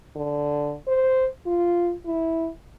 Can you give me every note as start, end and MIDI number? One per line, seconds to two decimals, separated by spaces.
0.16 0.74 50
0.87 1.27 72
1.46 1.94 65
2.06 2.48 64